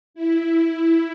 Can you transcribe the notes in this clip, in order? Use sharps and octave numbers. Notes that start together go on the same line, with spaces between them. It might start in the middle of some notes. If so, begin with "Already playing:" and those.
E4